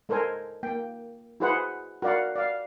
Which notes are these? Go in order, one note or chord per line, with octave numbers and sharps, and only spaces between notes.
G#3 A4 A#4 C5 G#5
A#3 G5
E4 F#4 G#4 B4 C5 F#5
F#4 A#4 D5 F5 F#5
D5 F5